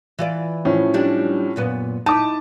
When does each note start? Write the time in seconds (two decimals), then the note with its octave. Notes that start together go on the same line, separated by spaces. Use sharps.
0.19 E3 F4 D5
0.65 A2 F3 C#4
0.94 F#3 G3 D4
1.56 F#2 A#2 B3
2.06 D#4 E4 A5 D6